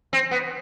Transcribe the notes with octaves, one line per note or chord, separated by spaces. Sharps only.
C4
B3